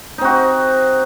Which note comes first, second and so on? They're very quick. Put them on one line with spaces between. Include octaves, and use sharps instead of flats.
D#4 C4 F#4